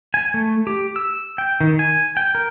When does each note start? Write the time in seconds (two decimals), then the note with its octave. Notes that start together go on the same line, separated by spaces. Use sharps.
0.14 G#5
0.34 A3
0.67 G4
0.96 E6
1.38 G5
1.61 D#3
1.79 G#5
2.17 G5
2.35 A#4